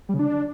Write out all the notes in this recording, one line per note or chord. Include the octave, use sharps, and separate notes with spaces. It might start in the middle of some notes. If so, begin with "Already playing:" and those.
G3
C#3
D4